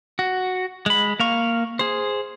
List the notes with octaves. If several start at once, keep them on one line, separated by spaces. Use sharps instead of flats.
F#4
G#3 B5
A#3 F5 C#6
G#4 C5